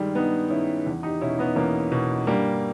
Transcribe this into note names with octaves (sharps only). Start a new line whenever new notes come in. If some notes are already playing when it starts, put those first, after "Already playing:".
Already playing: G2 D#3 G3 G#3
G2 B3 D#4
D#3 C#4 E4
E2
D#4 G4
B2 C#4 E4
B3 D#4
E2 A#3 C#4
B2
G2 G3 A#3